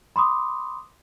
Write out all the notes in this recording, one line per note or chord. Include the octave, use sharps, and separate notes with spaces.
B5 C6 D6 D#6